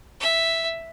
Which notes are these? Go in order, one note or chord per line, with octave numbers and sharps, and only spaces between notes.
E5